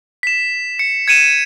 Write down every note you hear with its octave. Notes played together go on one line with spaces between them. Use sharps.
B6 E7
C#7
G#6 C#7 D#7 E7